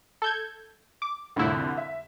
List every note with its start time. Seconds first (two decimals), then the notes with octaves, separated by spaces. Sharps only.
0.22 A4 G6 G#6
1.02 D6
1.36 C2 F2 A2 D3 E4
1.77 E5